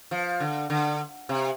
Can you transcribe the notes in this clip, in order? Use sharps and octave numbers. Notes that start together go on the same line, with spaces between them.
F3
D3
D3
C3